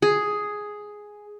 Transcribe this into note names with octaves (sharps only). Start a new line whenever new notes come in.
G#4